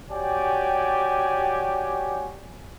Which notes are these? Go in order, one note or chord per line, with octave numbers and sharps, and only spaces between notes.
F#4 G4 C#5 D5 G5 G#5